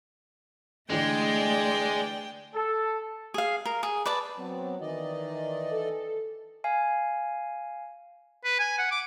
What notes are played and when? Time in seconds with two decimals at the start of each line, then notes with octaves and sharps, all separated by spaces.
0.90 D3 E3 G#3 A3 D4 D5 G5
2.54 A4
3.34 G#4 F5
3.65 A#4
3.83 G#4
4.06 B4 D5 A5
4.38 F#3 B3 C4
4.81 D#3 E3 D5 D#5
5.72 A4
6.64 F5 G#5
8.44 B4
8.60 G#5
8.78 F#5
8.91 D6